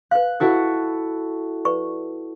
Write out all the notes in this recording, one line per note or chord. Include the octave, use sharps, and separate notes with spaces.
B4 F5 F#6
E4 F#4 A4 A#4 C5
B4 D5 C#6